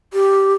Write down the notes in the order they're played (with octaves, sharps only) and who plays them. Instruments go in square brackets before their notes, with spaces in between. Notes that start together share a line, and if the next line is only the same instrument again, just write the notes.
[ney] G4